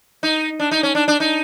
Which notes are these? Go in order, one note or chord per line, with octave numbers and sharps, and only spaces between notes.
D#4
D4
D#4
C#4
D4
D4
D#4